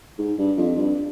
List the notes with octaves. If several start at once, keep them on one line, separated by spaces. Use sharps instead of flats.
G#2
G2
F2
G2